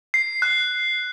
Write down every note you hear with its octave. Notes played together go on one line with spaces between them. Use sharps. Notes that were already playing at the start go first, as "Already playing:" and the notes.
C7
F#6